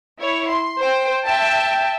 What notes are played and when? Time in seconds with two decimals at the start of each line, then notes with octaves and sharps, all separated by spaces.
0.18 E4 C#5
0.49 C6
0.79 C5 G5
1.24 E5 G5 A5